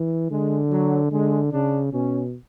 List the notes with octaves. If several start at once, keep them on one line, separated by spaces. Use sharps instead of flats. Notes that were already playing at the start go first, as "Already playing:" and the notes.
Already playing: E3
D3 G#3
F#3
D3 G#3
C#3 D4
B2 C#4